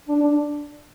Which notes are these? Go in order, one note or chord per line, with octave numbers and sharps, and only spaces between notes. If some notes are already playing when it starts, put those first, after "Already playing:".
D4
D4